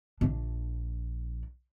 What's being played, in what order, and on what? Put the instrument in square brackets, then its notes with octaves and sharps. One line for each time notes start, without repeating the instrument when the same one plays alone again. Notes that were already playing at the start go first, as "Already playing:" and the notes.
[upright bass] A#1 D4